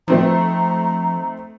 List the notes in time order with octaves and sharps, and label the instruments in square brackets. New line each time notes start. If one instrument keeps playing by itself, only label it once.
[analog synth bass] F3 [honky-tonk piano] A3 C4 D#4 [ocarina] A#5